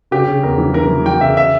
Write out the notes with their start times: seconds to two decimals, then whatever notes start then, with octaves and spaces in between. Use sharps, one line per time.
0.11 C#3 G4
0.27 C#3
0.43 E2 A#4
0.58 E3
0.74 E3 A#4
0.90 E3
1.06 E3 G5
1.21 C#3 E5
1.37 E5